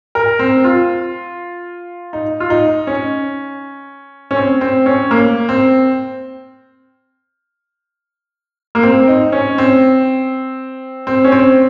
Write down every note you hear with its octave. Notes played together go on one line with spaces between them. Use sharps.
A#4
C4
F4
D#4
F4
D#4
C#4
C#4
C4
C4
C#4
A#3
C4
A#3
C4
D#4
C#4
C4
C4
C#4
C4